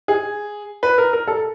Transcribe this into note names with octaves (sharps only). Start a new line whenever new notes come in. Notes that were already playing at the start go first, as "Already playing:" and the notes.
G#4
B4
A#4
A#4
A4